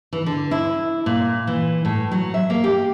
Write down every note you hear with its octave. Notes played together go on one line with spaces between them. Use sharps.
E3
D3
E4
A#2
E3
A2
F#3
E5
A#3
G4